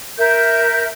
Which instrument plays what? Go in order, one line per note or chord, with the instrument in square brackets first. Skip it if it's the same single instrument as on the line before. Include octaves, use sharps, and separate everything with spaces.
[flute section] A#4 E5 G6